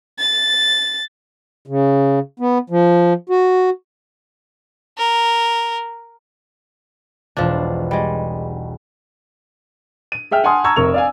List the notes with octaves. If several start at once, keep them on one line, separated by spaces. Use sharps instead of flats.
A6
C#3
B3
F3
F#4
A#4
E1 B1 F3 D4
G3 G#3
D#7
G#4 E5 G5 F6
F#5 G#5 A5 C6 D#6
A5 A#5 C#6 E6 G#6
F1 A#4 C#6 F7
D5 F5 G#5